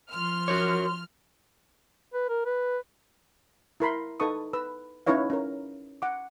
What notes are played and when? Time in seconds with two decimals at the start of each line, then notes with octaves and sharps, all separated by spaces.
0.12 F3 C6 F6
0.48 F#4 A#4 C#5
2.14 B4
2.29 A#4
2.46 B4
3.80 E4 A#4 B5 C6
4.20 D#4 A4 B4 A5 C#6 D#6
4.53 B4 E6
5.06 C#4 D#4 E4 B4 C#5 F5
5.30 C#4 A#4
6.02 F#5 D6